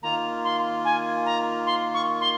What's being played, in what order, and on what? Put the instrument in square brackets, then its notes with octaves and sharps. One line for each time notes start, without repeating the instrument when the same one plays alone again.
[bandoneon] D#3 A#3 F4 [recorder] A#5
[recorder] C6
G#5
A#5
C6
C#6
C6